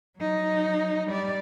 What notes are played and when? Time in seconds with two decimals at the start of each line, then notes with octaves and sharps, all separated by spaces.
0.18 F#3 D#4
1.07 G3 D5